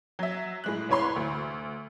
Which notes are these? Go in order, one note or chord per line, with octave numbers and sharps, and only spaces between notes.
F#3 E5
A2 G#3 F#6
C2 E3 B4 C#5 B5 C6
D2